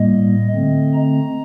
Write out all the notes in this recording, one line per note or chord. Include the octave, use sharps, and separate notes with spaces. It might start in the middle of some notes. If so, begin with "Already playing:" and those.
Already playing: A2 G3 A#3 D#5
D3 A3 C4 D#5
A#5